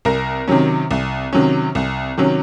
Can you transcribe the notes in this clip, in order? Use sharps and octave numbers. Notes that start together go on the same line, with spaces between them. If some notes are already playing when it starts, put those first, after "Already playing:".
C2 A#4
C3 D#3 F#3 C#4
C2
C3 D#3 F#3 C#4
C2
C3 D#3 F#3 C#4